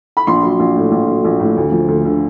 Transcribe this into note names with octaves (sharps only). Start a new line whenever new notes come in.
B5
A#1 C6
F#3
A#1
A2
A#1
F#3
A#1
A2
D2
F3
D2
D3